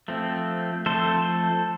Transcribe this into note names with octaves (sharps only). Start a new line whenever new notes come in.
F3 A3 C4
F3 A3 C4 A4 C5